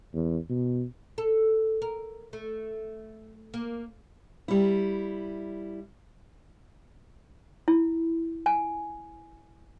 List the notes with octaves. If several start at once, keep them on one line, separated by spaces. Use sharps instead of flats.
E2
B2
A4
A#4
A3
A#3
G3 E4
E4
G#5